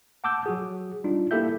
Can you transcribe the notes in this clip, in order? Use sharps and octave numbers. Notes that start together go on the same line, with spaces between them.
F#5 A5 D6 E6 G6
F#3 F#4 G#4
G3 D4 D#4 F4
A#3 E4 G4 A4 E5 G6